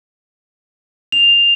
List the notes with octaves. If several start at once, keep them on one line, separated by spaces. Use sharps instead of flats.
F7